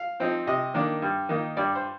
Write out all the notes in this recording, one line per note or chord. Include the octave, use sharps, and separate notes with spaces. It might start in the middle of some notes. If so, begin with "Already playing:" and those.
Already playing: F5
F3 C4 D#4
C3 D#5
D#3 A#3 D4
G2
D#3 A#3 D#4
G2 D5
C5